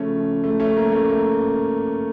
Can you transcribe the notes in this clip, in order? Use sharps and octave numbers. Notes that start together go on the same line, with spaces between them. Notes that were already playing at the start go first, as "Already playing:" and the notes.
Already playing: C#3 F3 A3 C#4
A3
A3 C#4
A#3
A3
A#3